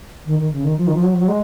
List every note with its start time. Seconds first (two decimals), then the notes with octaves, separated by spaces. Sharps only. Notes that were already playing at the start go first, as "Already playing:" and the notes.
0.26 D#3
0.39 D#3
0.52 C#3
0.64 D#3
0.77 F3
0.87 D#3
0.94 F3
1.03 F#3
1.13 F3
1.21 F#3
1.28 G#3